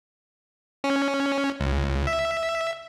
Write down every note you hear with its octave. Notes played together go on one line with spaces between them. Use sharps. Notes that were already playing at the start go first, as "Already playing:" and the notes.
C#4
C#2
E5